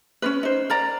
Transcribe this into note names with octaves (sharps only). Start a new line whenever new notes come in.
C#4 D4 B4
D#4 C5
A#4 D5 A#5